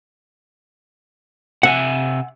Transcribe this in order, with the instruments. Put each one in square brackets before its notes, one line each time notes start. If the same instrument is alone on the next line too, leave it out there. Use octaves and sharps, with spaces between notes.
[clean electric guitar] C3 E5 G#5 [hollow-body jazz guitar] F#5